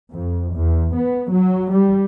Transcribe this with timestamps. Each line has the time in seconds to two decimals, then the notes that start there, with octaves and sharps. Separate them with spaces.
0.11 F2
0.55 E2
0.96 B3
1.31 F#3
1.72 G3